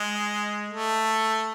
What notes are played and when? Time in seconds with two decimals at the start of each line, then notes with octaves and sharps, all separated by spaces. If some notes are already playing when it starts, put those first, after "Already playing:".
Already playing: G#3
0.69 A3